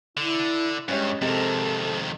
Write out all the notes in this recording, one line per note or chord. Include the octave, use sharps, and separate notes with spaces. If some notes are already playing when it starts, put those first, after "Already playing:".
D3 E4
G2 G#3 C#4 G4 C#5
F2 C3 D#3 G#3 C4 A4